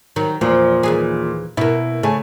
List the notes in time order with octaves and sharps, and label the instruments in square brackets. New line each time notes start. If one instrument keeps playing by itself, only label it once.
[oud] D#3 F#3
[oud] E2 F3 [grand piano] A#2
[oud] D#2 E3 G#4
[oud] B2 A#3 [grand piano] E4
[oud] C#3 [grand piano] A3 G#5